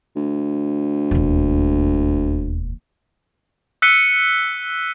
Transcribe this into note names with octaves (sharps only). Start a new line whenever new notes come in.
D2
E1 D#2
E6 F#6 B6 C#7 D#7 G7